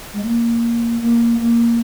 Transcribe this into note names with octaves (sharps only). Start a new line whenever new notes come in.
G#3
A#3
A#3
A#3